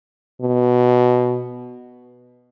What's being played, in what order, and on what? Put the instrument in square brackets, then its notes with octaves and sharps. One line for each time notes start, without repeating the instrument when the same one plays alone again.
[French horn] B2